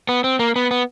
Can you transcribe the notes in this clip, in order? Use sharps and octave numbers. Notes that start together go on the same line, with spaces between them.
B3
C4
A#3
B3
B3